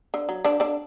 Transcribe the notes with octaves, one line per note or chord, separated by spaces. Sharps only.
D3
F#3
D3 D4
D3 D4